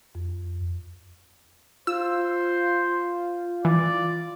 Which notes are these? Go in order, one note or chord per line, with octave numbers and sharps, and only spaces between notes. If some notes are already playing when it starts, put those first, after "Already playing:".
F2
F4 C5 E6
E3 D5